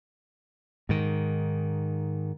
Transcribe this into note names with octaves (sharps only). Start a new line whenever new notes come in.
G#2 D#3